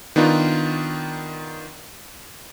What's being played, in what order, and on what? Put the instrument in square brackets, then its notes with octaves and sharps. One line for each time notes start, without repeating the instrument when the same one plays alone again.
[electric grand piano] D#3 B3 D4 D#4 F4